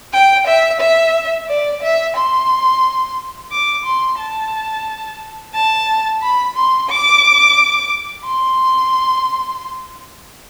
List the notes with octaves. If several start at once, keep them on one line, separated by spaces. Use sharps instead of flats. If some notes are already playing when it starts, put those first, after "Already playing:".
G5
E5
E5
D5
E5
C6
D6
C6
A5
A5
B5
C6
D6
C6